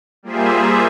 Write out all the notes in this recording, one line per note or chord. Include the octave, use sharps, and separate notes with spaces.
G3 A#3 F4 G#4 C5 E5